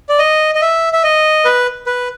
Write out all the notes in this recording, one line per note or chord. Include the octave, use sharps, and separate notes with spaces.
D5
D#5
D#5
E5
E5
D#5
B4
B4